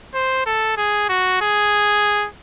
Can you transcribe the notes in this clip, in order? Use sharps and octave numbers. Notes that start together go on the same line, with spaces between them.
C5
A4
G#4
F#4
G#4